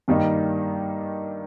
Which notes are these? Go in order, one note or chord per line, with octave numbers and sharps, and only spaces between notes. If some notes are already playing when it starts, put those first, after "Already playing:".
G2 D#3 G3 A#3 D#4